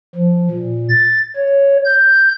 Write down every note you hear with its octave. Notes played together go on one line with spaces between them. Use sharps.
F3
A#2
A6
C#5
G6